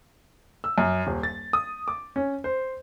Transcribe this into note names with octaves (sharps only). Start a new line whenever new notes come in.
E6
F#2
D#1
A6
D#6
D6
C#4
C5